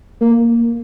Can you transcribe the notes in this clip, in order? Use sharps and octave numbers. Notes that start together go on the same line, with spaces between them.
A#3